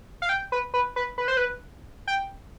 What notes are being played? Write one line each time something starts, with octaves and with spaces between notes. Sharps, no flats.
F5
G5
B4
B4
B4
B4
C5
B4
G5